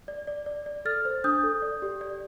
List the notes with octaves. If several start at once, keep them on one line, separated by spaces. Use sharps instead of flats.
D5
D5
D5
D5
A4 F6 A6
C5
D4 D#6 G6
A4
D5
G4
D5